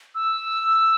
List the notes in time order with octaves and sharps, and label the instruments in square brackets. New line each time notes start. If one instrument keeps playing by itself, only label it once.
[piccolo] E6